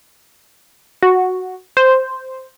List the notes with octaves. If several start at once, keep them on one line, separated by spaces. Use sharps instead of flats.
F#4
C5